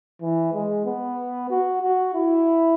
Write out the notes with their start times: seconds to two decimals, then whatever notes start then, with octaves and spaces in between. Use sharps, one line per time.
0.22 E3
0.53 G#3
0.85 B3
1.50 F#4
1.83 F#4
2.15 E4